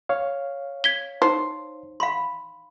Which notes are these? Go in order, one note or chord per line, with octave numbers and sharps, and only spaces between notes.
C#5 F5
G#6 B6 G7
D#4 C5
F5 B5 C6